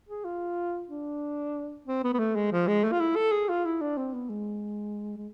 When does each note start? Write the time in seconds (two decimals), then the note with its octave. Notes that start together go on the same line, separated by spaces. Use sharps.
0.09 G#4
0.24 F4
0.89 D4
1.86 C4
2.03 B3
2.14 B3
2.19 A3
2.35 G#3
2.52 F3
2.67 G#3
2.84 A3
2.92 F4
3.00 E4
3.15 A4
3.32 G#4
3.49 F4
3.65 E4
3.81 D4
3.97 C4
4.13 B3
4.29 G#3
5.17 G#3